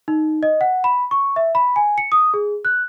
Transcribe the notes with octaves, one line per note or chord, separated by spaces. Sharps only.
D#4
D#5
F#5
B5
C#6
E5
B5
G#5
C#7
D#6
G#4
F#6